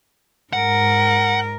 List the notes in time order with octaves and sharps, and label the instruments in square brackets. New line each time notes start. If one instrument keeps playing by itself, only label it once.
[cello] G#2 A#4 [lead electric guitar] F#5